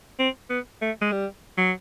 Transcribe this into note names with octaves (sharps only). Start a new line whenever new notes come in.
C4
B3
A3
G#3
G3
F#3